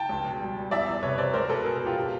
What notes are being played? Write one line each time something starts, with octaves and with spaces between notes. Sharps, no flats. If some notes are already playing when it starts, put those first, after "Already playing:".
Already playing: G5 A5
C#2
B2
G3
G3
E2 D5 E5
E2
C3 B4 C#5
C3 C5 D5
G#3 A#4 C5
B2 A4 B4
B2 G#4 A#4
B2
F4 G4
B2